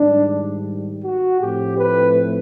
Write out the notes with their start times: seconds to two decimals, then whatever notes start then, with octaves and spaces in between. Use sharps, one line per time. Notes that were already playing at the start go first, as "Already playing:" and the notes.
Already playing: G#2 D#3 G3 D4
1.02 F#4
1.40 A2 F3 A3 C4 G4
1.78 B4